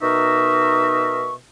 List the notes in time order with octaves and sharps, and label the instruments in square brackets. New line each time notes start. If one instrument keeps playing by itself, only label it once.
[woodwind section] B2 D#4 A#4 D#5 E5 C#6